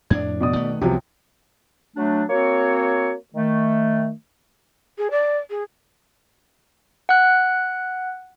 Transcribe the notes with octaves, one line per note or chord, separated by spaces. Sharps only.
F2 A2 D4 D5 G#6
B2 D5 D#6
D#3 A3 B3
C2 C3 F3 F#3 B3
F#3 A3 D4
A#3 C4 F#4 C#5
D#3 A3
G#4
D5
G#4
F#5 F#6